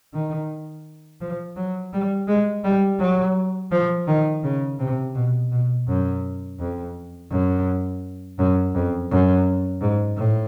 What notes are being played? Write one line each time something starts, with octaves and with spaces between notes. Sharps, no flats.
D#3
F3
F#3
G3
G#3
G3
F#3
F3
D#3
C#3
C3
B2
B2
F#2
F2
F#2
F#2
F2
F#2
G#2
A2